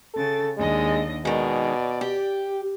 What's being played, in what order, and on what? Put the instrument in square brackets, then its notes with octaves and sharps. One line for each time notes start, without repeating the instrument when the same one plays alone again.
[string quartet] C#3 A6 [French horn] A4
[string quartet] D#2 D4 D#5 [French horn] G#3
[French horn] B2 [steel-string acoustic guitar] D#3 G#3 [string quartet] D5
[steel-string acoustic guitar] G4